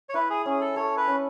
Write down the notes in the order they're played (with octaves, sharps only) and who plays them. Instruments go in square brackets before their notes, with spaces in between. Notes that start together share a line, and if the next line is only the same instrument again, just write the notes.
[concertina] C#5
[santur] E4 [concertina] B4
[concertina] G#4
[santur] C#4 [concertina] G#4
[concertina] A4
[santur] A4 [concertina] C#5
[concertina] B4
[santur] C#4